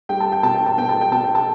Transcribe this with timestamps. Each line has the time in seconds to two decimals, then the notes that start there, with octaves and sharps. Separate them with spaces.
0.09 G3 G5
0.20 A5
0.32 G5
0.43 B2 A5
0.54 G5
0.66 A5
0.77 B3 G5
0.89 A5
1.01 G5
1.11 B2 A5
1.24 G5
1.35 A5